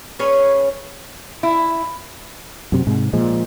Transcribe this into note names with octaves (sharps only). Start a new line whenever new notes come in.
C#4 G#4 B4 C#5
E4
F#2 C3
G#2 C3
A#2 F3 G#3